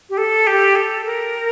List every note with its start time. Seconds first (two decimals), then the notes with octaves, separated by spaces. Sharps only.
0.10 G4
0.17 A4
0.47 G4
0.76 A4
1.05 A#4